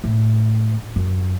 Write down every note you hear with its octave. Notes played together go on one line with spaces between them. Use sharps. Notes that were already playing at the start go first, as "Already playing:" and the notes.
A2
F#2